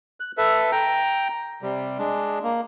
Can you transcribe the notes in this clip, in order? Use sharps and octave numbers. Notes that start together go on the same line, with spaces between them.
F#6
A4 B4 E5
G5 A#5
C3 G3
G#3 D4
A#3